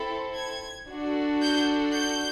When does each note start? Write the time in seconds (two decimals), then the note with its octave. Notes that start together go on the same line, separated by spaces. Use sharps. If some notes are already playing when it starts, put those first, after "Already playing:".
Already playing: C4 E4 A4
0.37 G#6
0.89 D4 F#4 A4
1.42 G6
1.95 G6